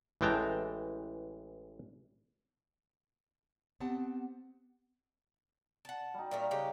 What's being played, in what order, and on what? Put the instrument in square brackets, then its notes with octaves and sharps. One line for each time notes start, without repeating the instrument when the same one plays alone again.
[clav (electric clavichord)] A1 E3 G#3 G5 A5 A#5
[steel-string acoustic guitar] B3 C4 G4 F#5 A5
[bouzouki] F#5 A5
[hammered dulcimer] G3 D#4
[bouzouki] A#2 A3 A#4 [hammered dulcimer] F5
[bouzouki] C#3 G#3 G4